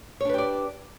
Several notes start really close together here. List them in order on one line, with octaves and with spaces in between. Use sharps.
C#5 D4 B4 G4 D5